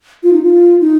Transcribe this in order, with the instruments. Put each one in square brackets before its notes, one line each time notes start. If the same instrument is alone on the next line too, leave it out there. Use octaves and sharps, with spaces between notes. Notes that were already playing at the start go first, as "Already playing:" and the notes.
[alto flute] F4
D#4
F4
D#4